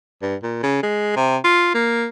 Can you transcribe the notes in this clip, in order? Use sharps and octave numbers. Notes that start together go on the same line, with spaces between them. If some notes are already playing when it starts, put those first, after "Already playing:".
G2
A#2
C#3
G#3
C3
F4
A#3